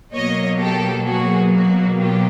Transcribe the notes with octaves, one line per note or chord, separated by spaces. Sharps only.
B2 F#3 A#3 C#5 D#5
G4 A4
F#4 G#4
F#4
F4 G4